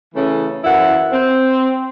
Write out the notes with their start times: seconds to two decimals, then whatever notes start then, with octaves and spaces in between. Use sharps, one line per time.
0.15 C#3 E3 A3 C#4
0.64 F#2 E3 E4 F#5
1.13 C4